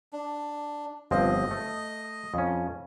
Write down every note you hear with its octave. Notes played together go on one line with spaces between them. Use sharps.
D4
G1 F3 C4 D#5
A3
F2 C#4